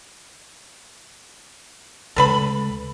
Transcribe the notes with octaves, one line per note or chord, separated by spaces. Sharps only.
D2 C#3 G#3 A4 B4 B5